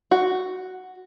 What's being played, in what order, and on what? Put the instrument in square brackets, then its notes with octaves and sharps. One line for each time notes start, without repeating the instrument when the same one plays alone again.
[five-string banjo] F#4